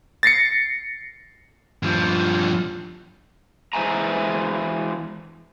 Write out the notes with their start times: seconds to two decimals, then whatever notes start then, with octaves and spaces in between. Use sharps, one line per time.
0.23 A6 A#6 C7 C#7
1.83 G2 F3
3.73 E3 G#3 C5 E5 G#5 A#5